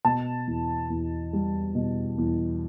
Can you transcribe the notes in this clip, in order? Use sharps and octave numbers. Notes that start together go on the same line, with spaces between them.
B2 A5
E2
E2
G3
B2
E2